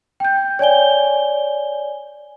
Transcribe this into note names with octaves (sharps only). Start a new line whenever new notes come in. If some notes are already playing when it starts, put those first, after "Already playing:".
G5 G6
C#5 D5 G#5 G7